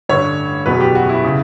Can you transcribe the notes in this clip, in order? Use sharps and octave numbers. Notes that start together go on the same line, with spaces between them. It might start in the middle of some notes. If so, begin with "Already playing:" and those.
A1 G2 D3 C#5
F#1 E2 B2 F#3 B3 B4
G4
F#4
E4
C#3